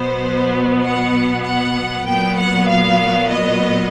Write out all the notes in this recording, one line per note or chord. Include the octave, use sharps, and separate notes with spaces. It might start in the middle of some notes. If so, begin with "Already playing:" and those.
Already playing: B2 F#3 B3 C5
F#5
F#5
A#2 F#3 B3 G5
F#5
F5
D#5